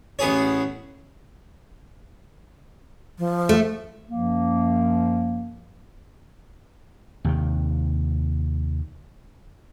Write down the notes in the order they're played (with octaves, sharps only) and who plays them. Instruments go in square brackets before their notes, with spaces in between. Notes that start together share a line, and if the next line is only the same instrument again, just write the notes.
[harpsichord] A1 B3 G#4 C#5
[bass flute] F3
[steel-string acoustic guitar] A3
[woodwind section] F#2 F3 A#3
[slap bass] D#2 C3 D#3